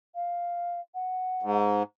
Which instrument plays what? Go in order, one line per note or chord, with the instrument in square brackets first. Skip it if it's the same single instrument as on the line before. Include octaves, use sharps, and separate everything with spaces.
[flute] F5
F#5
[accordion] G#2